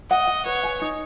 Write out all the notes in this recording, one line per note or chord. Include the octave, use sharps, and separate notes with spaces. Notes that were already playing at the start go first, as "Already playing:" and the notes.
D#5 F#5
F#5
B4 C#5
G#5
D#4